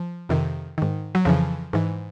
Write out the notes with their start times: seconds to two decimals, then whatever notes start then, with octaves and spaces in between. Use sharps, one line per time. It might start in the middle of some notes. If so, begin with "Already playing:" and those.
Already playing: F3
0.29 F2 C3 D#3
0.78 G#2 D#3
1.15 F#3
1.25 F2 C#3 E3 F3
1.73 G#2 E3